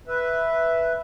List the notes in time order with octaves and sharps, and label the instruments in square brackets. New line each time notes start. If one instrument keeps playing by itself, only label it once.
[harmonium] B4 E5